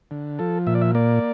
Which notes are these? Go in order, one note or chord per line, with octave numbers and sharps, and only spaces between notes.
D3
F3 A4
A#2 E5
D5
E5
A#3 D5